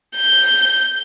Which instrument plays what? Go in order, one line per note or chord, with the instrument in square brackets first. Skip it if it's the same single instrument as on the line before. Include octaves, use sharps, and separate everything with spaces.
[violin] G6